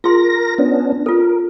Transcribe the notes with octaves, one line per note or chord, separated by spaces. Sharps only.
F4 G#4 A#4 C6 A#6
B3 C#4 D4
F4 A4 A#4